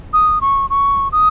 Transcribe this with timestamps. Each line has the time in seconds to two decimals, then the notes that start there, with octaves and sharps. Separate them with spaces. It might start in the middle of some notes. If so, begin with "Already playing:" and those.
0.13 D#6
0.41 C#6
0.70 C#6
1.12 D#6